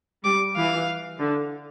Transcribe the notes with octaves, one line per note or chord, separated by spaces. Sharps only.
G3 D6
E3 F5
D3